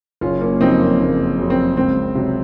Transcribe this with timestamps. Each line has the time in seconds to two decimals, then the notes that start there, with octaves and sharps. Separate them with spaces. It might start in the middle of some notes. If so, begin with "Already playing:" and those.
0.21 F#1 C#4 F4
0.41 A#3 C#4
0.60 F2 C#3 F#3 C4 D#4
0.79 A#3 C#4
0.99 F#1 A#3
1.38 F2 C#3 F#3
1.50 C4
1.77 C#2 C4
2.15 C3 F#3